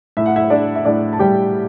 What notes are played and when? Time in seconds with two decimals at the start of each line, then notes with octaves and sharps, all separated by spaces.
0.17 A2 E5
0.26 F#5
0.36 E4 E5
0.50 D4 D5
0.75 E5
0.85 A2 D4 D5
1.13 A5
1.19 G3 G4 G5